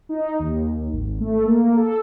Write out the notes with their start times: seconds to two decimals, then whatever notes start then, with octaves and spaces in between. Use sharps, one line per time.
0.09 D#4
0.39 D#2
0.93 G#1
1.20 A3
1.45 A#3
1.77 A4